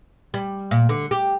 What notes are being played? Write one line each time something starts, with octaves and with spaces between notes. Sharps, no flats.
G3
A#2
D3
G4